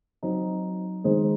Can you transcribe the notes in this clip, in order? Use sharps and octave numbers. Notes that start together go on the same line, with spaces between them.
F#3 C4 D#4
D#3 G#3 D#4 G#4 C5